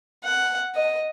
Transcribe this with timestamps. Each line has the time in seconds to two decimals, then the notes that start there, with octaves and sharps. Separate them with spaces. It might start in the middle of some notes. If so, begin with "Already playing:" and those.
0.24 F#5
0.75 D#5